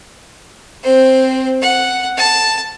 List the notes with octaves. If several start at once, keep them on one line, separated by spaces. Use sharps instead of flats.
C4 C5
F#5
A5